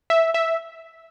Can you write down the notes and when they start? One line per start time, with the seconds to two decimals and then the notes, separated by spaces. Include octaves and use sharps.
0.10 E5
0.34 E5